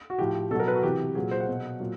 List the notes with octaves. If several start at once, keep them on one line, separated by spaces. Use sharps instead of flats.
F#4
A2 F3 G4
B2 F#3 A4 A#4
B4
F#4
C3 E3 G4
A#2 F#3 G#4
C5
F#5
B2 F#3
A#2 F#3